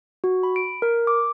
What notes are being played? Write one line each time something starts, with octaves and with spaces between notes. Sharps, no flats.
F#4
B5
D7
A#4
D6